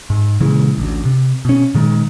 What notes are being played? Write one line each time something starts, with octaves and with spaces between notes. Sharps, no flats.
G#2
A#2 C#3 E3 G#3
A1 D2
C3
B2 C#4
A#2 D#3 G#3